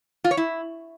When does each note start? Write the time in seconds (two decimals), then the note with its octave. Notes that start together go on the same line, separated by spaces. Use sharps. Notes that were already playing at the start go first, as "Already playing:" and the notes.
0.24 F4
0.31 C#5
0.37 E4